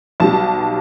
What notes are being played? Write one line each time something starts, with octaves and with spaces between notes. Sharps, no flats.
B1 B2 G3 A5